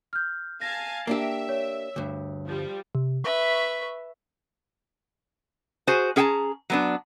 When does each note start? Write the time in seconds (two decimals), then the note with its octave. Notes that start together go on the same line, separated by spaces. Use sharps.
0.13 F6 G6
0.62 F5 G#5 A5 A#6
1.07 A#3 D4 G4 E5
1.49 C#5
1.96 D2 G2
2.48 F3 G3
2.95 C3
3.24 B4 E5 C#6
5.87 F#4 G#4 C5 G#5
6.16 C#4 G#4 F#5 G5 A5 A#5
6.70 F#3 B3 D4